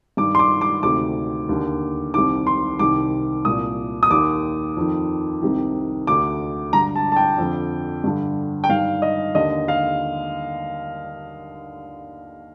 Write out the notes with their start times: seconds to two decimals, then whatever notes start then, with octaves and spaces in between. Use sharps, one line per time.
0.17 G2 D#3 D6
0.35 C6
0.39 D6
0.61 D6
0.83 D2 C3 D#3 D6
1.49 D#2 D3
2.14 C2 C3 D#3 D6
2.47 C6
2.79 C2 C3 D#3 D6
3.45 C2 A#2 D#6
4.03 D#6
4.10 D#2 D#3 D6
4.77 F2 D#3
5.42 C2 C3 D#3
6.07 D2 D3 D6
6.73 G2 D3 A#5
6.96 A5
7.12 A5
7.16 G5
7.38 F2 D3
8.04 G2 D3
8.64 G5
8.70 G2 D#3 F5
9.02 D#5
9.35 D#2 D3 D#5
9.68 F5